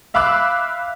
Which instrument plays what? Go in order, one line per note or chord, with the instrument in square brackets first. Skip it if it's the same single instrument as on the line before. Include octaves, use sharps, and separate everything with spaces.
[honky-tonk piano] E5 F5 B5 D6 E6 F#6